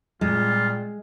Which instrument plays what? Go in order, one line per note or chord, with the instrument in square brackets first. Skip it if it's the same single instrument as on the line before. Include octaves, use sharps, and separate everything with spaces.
[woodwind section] A#2 G3 C4 [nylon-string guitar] G#3 [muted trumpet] F4